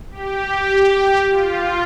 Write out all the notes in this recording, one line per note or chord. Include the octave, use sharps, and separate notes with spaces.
G4
F4